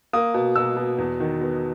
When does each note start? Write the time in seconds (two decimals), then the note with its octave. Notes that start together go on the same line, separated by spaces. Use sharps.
0.13 A#3 D#6
0.34 B2
0.56 B2 E6
0.77 B2
0.98 E2
1.20 D#3
1.41 B3